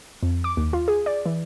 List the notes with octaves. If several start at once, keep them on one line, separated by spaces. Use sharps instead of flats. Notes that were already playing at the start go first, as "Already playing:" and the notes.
F2
D6
D#2
F4
G#4
D5
E3